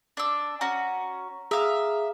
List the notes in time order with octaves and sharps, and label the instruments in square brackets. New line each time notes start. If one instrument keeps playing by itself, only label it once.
[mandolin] D4 E6
[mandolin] C#4 F#4 [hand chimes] A#5
[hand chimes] G#4 A#5 D#6 [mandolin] E5 F5